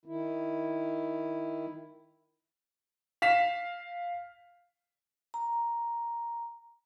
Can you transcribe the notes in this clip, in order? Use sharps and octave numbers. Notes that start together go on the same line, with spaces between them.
D#3 E4
F5 B6 E7
A#5